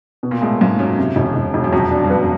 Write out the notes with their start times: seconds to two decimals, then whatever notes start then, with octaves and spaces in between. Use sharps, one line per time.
0.23 B2
0.31 A#2
0.41 A2 G#3
0.61 G#2 C#4
0.79 F#2 C#4
0.98 C3
1.16 E1
1.36 E1
1.54 E1
1.64 F#2
1.72 F2 F#3
1.91 D4
2.04 G2
2.10 F#2 B3